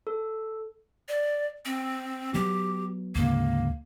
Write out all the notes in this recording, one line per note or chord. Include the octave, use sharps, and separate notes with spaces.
A4
D5
C4
F#3 B3 G4
D2 G#2 C#3 A#3